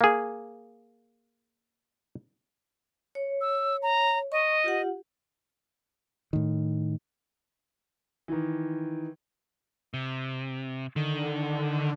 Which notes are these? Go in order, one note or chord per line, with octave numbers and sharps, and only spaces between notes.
A#3 G#4
C#5
E6
A#5
D#5 C#6
F4 G4 F#5
A2 D#3
D#3 E3
C3
D3 D#3